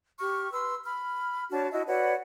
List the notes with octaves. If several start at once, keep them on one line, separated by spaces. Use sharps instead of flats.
G4 C#6 F6
B4 C6 E6
B5 F6
D4 F#4 C#5 A5
E4 F#4 D#5 E5
F#4 B4 C#5 D5